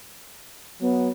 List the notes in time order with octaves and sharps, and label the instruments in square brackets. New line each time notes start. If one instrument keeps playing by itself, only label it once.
[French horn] F#3 [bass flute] B3